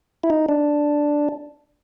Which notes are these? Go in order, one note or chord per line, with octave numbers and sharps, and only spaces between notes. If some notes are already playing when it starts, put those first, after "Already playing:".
E4
D#4
D4